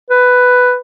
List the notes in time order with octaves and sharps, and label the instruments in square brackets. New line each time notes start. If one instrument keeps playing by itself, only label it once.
[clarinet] B4